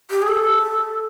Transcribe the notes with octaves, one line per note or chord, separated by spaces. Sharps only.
G4
G#4
A4